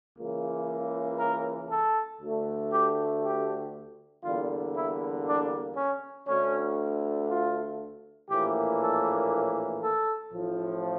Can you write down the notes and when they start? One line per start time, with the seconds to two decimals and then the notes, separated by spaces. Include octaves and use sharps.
0.18 C#2 C#3 E3 A#3
1.20 A#4
1.70 A4
2.21 D2 D3 A3
2.72 G4
3.23 G4
4.24 E2 D3 G3 A#3 F4
4.74 E4
5.25 D4
5.76 C#4
6.27 D2 D3 A3 C#4
7.28 F4
8.30 A#1 A2 E3 A#3 G4
8.81 A4
9.82 A4
10.33 A1 A2 F3